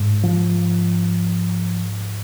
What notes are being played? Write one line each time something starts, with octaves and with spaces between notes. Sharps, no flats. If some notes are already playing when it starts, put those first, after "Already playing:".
Already playing: G#2
F3